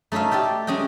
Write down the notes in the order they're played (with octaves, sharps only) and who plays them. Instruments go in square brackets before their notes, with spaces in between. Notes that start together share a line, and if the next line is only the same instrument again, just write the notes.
[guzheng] A3 D#4 C#5 E5 F5
G4 D5 E5 G5
G#3 C#4 G#4 D#5 G5